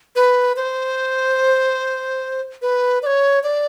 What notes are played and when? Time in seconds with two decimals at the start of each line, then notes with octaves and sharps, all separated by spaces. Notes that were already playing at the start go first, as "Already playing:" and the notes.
0.16 B4
0.56 C5
2.62 B4
3.03 D5
3.06 C#5
3.43 D5